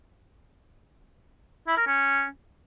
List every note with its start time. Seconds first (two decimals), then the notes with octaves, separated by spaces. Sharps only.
1.68 E4
1.77 A#4
1.87 C#4